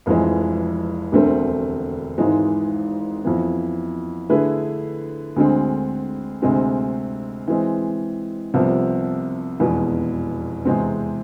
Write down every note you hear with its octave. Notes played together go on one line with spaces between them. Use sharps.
F1 F2 E3 G#3
E1 D2 D3 A3 C4
G#1 G#2 E3 G#3
F2 E3 B3
D3 A3 E4 G#4 B4
D2 D3 G#3 C4
D2 C3 G#3 C4
E3 G#3 C4
C2 C3 F3 B3
F1 E2 B2 G#3
E2 C3 G#3 C4